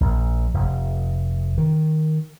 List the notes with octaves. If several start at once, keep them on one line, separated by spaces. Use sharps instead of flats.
A#1
F1
D#3